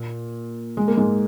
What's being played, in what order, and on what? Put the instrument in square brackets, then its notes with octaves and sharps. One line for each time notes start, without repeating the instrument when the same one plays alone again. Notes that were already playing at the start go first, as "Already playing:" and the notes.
Already playing: [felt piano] A#2
G#3
A#3
G#2 G#3